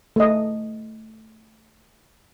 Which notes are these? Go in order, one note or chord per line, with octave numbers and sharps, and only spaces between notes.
A3 D#5